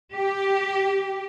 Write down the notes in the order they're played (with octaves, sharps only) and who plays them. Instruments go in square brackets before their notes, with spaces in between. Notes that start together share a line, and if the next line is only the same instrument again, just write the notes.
[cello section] G4